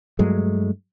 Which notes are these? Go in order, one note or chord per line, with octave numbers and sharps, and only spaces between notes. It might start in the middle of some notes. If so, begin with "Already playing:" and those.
G2 F#3 G#3 A3